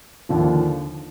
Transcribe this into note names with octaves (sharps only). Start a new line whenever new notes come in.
D#2 D3 F3